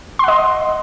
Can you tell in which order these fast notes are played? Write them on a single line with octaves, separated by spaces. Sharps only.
C6 F#5 D#5